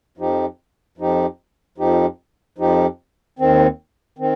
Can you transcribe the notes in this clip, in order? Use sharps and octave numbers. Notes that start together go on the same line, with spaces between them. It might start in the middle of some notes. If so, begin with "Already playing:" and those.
F2 F3 D#4 G4
F2 F3 D#4 G4
F2 F3 D#4 G4
F2 F3 D#4 G4
D#2 D#3 C4
D#3 C4